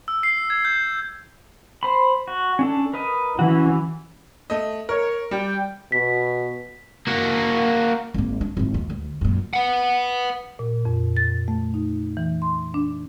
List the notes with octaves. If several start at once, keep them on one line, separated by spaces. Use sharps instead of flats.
E6
C7
G#6
G6
C5 B5
F#4
C#4 D4 A4
A#4 B4 D#5
E3 C#4 F#4
A3 D#5
A#4 C#5
G3 D5 G5
B2 B6
A#3 F#4
G#1 A#3
D4
G#1 E3
D#2 A#3
D2
F#2 A#2
B4 F#5
A#2
F2
A6
A3
D#4
E3
C6
D4